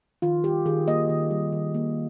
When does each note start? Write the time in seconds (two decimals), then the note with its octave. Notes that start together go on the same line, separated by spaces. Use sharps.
0.22 D#3 F4
0.44 G3 G4
0.66 D#3 G#4
0.87 A#3 D#5
1.09 D#3
1.31 G3
1.53 D#3
1.74 A#3